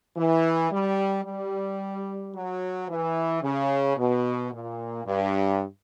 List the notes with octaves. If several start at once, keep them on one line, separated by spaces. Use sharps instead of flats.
E3
G3
G3
F#3
E3
C#3
B2
A#2
G2